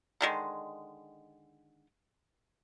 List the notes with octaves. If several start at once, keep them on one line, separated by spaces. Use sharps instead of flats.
D3 D#3 G#3